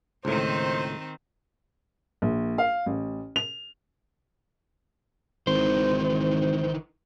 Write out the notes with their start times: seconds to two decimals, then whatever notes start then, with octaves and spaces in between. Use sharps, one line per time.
0.25 C#2 A2 D#3 C4 D#4 C5
2.22 A#1
2.58 F5
2.86 A1
3.36 F7
5.47 G#1 D#3 E3 C5